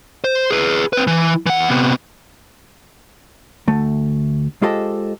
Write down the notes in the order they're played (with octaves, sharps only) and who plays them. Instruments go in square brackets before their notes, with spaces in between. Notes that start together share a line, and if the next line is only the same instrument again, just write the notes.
[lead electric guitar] C5
G#4 B4
C4 B4
E3
E3 F#5
C3 B3
[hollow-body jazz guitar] D2 A3
G#3 F4 G4 A4 C5 D#5